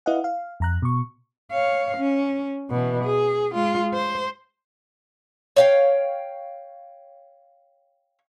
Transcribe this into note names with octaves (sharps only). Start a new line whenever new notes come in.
E4 B4 D#5 F5 F#5
F5
F2 A#5 F#6
B2 C#6
C#5 F5
C#4
B2 E3
G#4
G#3 F4
C5
C#5 F5 G5